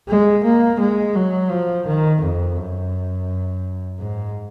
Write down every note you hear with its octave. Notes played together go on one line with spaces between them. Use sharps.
G#3
A#3
G#3
F#3
F3
D#3
F2
F#2
G#2